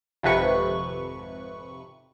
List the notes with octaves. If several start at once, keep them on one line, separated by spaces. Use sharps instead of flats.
G#1 F2 C3 B4 C#6